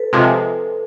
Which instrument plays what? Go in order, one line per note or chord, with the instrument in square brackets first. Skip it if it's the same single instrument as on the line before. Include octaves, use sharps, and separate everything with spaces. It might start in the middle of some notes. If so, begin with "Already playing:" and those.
Already playing: [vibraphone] A4 B4
[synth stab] C3 F3 G#3